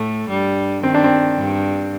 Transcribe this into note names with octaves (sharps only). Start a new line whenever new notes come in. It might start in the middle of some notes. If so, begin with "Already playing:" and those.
Already playing: A2 A3 A4
G2 G3
D#3 C4
D4
C4
G2